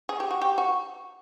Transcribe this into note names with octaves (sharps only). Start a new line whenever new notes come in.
G#4
G4
F#4
G4
F#4